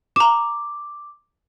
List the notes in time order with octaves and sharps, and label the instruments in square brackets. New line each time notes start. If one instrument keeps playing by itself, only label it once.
[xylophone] A#5 E7 [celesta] D6